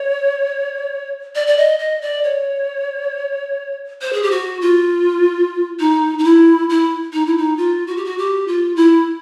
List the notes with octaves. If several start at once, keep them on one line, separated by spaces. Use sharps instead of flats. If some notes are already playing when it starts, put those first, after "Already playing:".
Already playing: C#5
D5
D5
D#5
D#5
D5
C#5
C5
G#4
G4
F#4
F4
D#4
D#4
E4
E4
D#4
E4
D#4
F4
F#4
G4
F#4
G4
F4
E4